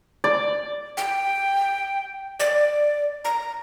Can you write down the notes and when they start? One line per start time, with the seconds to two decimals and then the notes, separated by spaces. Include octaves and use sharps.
0.24 D5
0.97 G5
2.40 D5
3.25 A#5